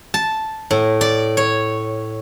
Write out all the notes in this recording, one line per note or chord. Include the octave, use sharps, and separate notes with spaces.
A5
A2
D5
C#5